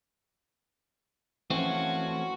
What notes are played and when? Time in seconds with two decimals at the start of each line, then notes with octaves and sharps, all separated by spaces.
1.51 E3 F3 A3 C4 C#4 F#4